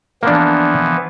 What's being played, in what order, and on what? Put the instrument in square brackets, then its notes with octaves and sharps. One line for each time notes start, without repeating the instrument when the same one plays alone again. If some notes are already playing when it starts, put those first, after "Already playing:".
[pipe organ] E3 F3 B3 [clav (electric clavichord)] A#3 D4